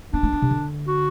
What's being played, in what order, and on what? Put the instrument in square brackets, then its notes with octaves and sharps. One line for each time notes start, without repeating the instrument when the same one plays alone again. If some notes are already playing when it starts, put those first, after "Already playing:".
[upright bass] B3 [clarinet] D4
[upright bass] A3
B3
C3
D3
[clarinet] F#4